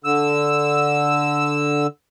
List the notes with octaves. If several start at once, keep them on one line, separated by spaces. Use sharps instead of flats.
D3 E6